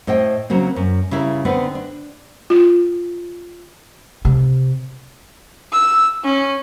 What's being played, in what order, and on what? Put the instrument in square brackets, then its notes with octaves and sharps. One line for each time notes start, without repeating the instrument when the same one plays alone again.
[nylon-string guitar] A2 C5 D#5 G5
C#3 F#3 A#3 C4
F#2
C#3 G3 E4 A#4
D3 B3 C4 D#4 B4
D4
[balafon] F4
[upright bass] C3
[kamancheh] E6
C#4